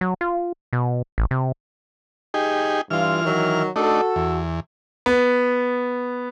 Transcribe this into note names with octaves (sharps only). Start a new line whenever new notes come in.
F#3
F4
B2
A1
C3
D#4 G4 G#4
G2 E3 F4 F6
D#3 F#3
A3 D4 D#4 F#4 A4
E2
B3